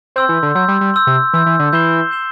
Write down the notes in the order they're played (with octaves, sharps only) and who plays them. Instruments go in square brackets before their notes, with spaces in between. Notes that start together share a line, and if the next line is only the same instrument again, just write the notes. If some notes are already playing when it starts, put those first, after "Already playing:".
[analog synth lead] C4 [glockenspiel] C6 E6 G6
[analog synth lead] E3
D3
[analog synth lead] F#3 [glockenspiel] C6 E6 G6
[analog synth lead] G3
G3
[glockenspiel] C6 E6 G6
[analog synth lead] C3
[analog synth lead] E3 [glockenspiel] C6 E6 G6
[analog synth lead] E3
D3
[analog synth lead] E3 [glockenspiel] G6 C7 E7 G7
[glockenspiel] G6 C7 E7 G7